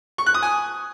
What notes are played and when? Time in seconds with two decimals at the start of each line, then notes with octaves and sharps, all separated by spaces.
0.18 C#6
0.26 F#6
0.34 D#6
0.42 G#5